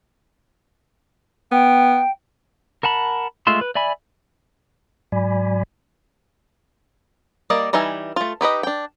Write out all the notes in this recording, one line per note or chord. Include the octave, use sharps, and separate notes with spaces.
B3 G5
A#4 F#5 A5 B5
G#3 A3 F4 E5 C6
B4
D5 E5 G#5 B5
G#2 F#3 D5 G#5 B5
G3 A#3 D5 D#5
E3 G3 D#4 E5 G#5
A3 F4
D#4 G4 B4 D#5
D4 G5